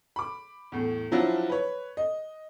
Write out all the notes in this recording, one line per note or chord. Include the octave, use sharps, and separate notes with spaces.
B5 D6
E2 A2
F3 F#3 D4 E4 F4
B4 C#5
D#5